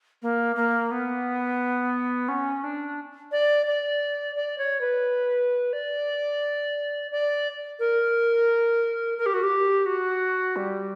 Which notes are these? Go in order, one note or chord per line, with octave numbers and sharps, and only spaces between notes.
A#3
A#3
B3
C#4
D4
D5
D5
D5
C#5
B4
D5
D5
A#4
A#4
G4
F#4
G4
F#4
G3